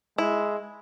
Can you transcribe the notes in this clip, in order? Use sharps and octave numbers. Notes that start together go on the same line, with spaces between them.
G#3 E4